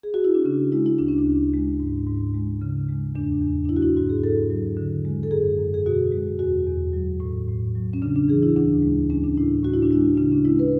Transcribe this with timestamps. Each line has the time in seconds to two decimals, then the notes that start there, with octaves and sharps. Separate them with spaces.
0.03 G#4
0.14 F#4
0.25 E4
0.35 D4
0.45 C#3 C#4
0.72 G#3 E4
0.86 E4
0.98 D2 D4
1.08 C#4
1.18 D4
1.26 D2
1.54 G#3
1.80 G#2
2.07 G#2
2.34 G#3
2.62 C#3
2.89 G#3
3.15 E2 D4
3.42 E2
3.65 D4
3.69 F#3 E4
3.76 F#4
3.83 E4
3.97 G#2 F#4
4.10 G#4
4.24 G#2 A4
4.50 F#3
4.77 D3
5.05 G#3
5.23 A4
5.31 F#2 G#4
5.59 F#2
5.74 G#4
5.86 B2 F#4
6.12 G#3
6.39 E2 F#4
6.67 E2
6.93 F#3
7.20 A2
7.48 A2
7.75 F#3
7.93 C#4
8.02 C#3 D4
8.16 D4
8.28 E3 G#4
8.43 E4
8.56 D2 D4
8.82 G#3
9.10 G#3 C#4
9.24 D4
9.37 A2 E4
9.63 A2 F#4
9.74 E4
9.82 D4
9.91 G#3 E4
10.18 C#3 D4
10.32 C#4
10.45 G#3 E4
10.59 B4